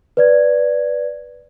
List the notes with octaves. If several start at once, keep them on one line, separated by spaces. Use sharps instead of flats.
B4 D5 G#6